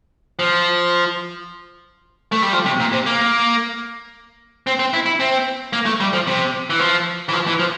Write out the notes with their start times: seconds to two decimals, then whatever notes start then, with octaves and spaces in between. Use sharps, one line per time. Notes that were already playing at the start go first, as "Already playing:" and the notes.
0.39 F3
2.32 A3
2.42 G3
2.53 F3
2.65 C3
2.80 A#2
2.93 C3
3.06 A#3
4.67 C4
4.79 C4
4.93 E4
5.06 E4
5.20 C4
5.73 A#3
5.86 A3
6.00 G3
6.13 F3
6.27 C3
6.70 E3
6.79 F3
7.29 E3
7.33 F3
7.47 E3
7.59 F3